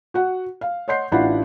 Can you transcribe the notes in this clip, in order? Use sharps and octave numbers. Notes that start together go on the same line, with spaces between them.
F#4 F#5
F5
C#5 D#5 F#5 C6 G6 C7
A1 D4 E4 F4 F#5 B5